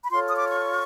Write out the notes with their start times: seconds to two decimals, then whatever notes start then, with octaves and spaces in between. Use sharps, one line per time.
0.04 B5
0.11 F4 A4 C#5 C6
0.29 D#6
0.36 D6
0.49 C#6